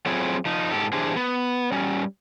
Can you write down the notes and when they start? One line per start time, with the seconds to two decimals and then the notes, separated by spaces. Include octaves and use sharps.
0.06 F#3 A3 C4 E4 F4 G#4
0.45 F3 D#4
0.71 G#2 G4 A4
0.93 E3 D4 G4 G#4 C5
1.16 B3
1.72 G3 C#4